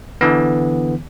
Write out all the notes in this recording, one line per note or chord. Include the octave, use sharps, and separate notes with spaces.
D3 E3 B3